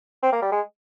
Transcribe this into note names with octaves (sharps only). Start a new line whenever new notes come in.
C4
A#3
G3
G#3